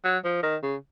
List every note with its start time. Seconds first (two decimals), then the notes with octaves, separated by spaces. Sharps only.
0.04 F#3
0.24 F3
0.43 D#3
0.62 C#3